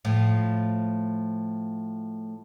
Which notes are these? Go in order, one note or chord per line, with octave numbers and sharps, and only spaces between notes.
A2 F3